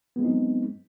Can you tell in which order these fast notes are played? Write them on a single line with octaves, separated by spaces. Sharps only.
B3 G#3 C4 D#4 F#3